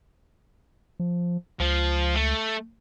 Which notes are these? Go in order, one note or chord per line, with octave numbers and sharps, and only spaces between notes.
F3
C#2 F3
A3